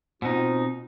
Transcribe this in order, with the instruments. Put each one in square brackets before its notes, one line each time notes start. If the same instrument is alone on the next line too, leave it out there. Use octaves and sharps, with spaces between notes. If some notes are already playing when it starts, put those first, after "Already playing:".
[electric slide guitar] B2 D#4 [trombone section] C4 [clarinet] F4